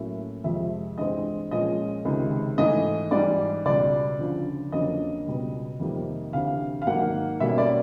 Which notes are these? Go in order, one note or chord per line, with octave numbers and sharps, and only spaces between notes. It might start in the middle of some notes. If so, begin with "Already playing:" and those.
Already playing: A2 F#3 A#3 C#4 E5
F2 C3 F3 G#3 E5
G2 E3 G#3 C4 D#5
A#2 F3 G#3 C#4 D#5
C#2 C3 D#3 G#3
G#2 E3 A3 D#5
G#2 E3 G3 D5
C#2 B2 G3 D5
D2 C#3 F3
F2 D3 F#3 A#3 C#4 D#5
C#2 B2 G3 B3
F2 C3 D#3 G3 A#3
D2 C3 E3 F5
F5
G#2 D#3 F#3 A#3 F#5
B2 G3 A#3 C#4 E5
D5